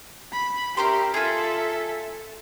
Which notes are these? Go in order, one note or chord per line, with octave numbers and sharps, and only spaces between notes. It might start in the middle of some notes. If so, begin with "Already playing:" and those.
B5
C#4 G4 A#4 E5 C6
F4 G#4 A4 E5